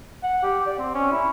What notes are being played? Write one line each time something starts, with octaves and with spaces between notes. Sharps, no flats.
F#5
G4
D5
C4
C#4
E4